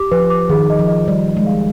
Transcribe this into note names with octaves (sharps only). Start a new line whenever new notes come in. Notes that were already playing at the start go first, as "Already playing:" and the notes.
Already playing: G4 D6
F3 B4
D6
D#3 G#4
D#5
F3
D#5
G3 D5
G4
G#3
F5